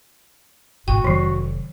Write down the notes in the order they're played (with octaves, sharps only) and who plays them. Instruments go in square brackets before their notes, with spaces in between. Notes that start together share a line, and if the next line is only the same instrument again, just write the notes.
[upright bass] G#1 B2 [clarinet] F#4 [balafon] G5
[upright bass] F1 [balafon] D#3 F#3